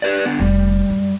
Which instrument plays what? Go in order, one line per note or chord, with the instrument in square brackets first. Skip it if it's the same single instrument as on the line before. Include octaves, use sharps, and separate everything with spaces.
[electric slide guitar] G4 B4 D5
D3 B3
[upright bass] F1 D3 [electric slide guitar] G3
[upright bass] F#2